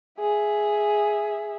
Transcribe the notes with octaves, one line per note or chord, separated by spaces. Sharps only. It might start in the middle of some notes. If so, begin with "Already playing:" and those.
G#4 E5